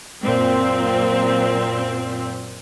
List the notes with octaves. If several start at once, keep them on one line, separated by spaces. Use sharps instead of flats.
F#2 A#2 C4